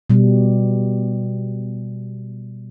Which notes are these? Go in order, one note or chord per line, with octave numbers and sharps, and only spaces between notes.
B2 G3